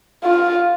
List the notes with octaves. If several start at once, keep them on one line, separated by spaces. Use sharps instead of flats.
F4